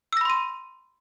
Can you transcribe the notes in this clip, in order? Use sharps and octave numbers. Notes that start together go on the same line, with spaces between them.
B5 C6 E6 A#6 D#7